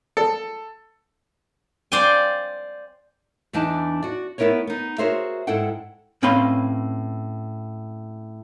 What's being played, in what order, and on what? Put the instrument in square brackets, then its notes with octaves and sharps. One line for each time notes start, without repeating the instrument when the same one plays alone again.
[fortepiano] A4
[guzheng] C5 D5 F5 G5 G#5
[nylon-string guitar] E2 E3 D4 D#4 A5
F#4 D5
A3 B3 E4 A#4 B4 C#5
B3 D#4
F#4 G#4 A#4 C5 C#5 E5
G#2 E4 A4 F#5 G5
[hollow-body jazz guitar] A2 C4 C#4 B4 F5 C6